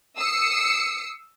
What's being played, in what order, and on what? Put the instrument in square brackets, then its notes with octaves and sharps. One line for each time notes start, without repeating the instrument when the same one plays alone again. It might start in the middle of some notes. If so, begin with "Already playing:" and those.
[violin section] D#6 E6 C7 C#7